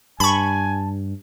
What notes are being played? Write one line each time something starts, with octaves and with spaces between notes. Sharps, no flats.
G2 G#5 A5 B5 C#6